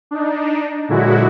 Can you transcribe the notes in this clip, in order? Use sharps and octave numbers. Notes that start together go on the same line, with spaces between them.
D4 D#4
A#2 D3 F#3 G#3 E4 F#4